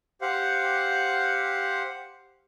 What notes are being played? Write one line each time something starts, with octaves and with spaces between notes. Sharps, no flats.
G4 C5 F5 F#5